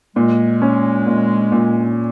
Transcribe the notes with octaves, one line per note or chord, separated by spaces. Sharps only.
A#2 G#3
C#4
A#2
A#2